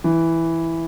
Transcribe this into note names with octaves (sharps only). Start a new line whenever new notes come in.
E3